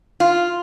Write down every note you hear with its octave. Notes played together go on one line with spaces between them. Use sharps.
F4